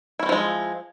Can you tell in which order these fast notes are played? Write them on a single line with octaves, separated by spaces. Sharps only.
E4 C#4 C4 F3 G#3